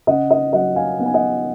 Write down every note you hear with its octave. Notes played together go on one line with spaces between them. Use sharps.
C#3 D#5 F#5
D#5
F#3 D#5 F#5
F5 G#5
B3 F#5
G#5
D#5 F#5